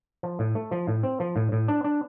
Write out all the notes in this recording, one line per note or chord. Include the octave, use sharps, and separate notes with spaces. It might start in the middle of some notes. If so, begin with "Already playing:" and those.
F3
A2
A3
F3
A2
C4
F3
A2
A2
D4
D4